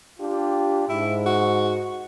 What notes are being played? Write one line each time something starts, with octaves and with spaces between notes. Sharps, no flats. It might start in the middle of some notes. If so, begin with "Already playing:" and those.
D4 F4 G4
G#2 E4
F#4